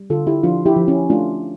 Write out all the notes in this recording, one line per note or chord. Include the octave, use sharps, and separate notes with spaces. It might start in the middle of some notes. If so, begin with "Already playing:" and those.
Already playing: G3
D3 F4 A4
E4 G4
F3 D4 F4
E4 G4
F3
C#4 E4
A3 D4 F4